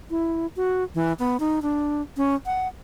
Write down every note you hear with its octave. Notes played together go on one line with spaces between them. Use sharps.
E4
F#4
E3
B3
D#4
D4
C#4
F#5